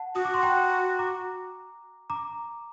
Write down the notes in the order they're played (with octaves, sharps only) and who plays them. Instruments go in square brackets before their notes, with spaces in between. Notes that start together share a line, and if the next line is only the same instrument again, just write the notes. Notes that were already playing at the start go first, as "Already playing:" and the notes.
Already playing: [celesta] F#5 A5
[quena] F#4 [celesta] D#6
[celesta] D6
C6
G5 A#5
A#5 D6
A#5 D6